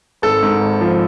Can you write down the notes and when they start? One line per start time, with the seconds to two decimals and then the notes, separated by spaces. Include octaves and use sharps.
0.22 G#1 A4
0.43 G#2
0.61 G#1
0.81 F3